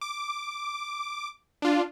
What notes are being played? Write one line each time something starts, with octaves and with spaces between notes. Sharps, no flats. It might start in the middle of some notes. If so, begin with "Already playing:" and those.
D6
D4 F4